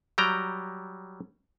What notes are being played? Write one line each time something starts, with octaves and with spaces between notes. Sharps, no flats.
F#3 G3 G5 A#5